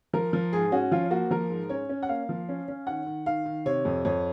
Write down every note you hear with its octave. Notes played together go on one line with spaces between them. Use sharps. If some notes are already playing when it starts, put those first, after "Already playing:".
F3 A#4
F3
G#2 G#4
C#4 F#4
F3 F4
A#3 F#4
F3 A#4
G#2
C#4 C#5
C#4
F#5
A#3 F5
F3
C#4
C#4
D#3 F#5
D#3
D#3 F5
D#3
C3 C#5
F2
F2 C#5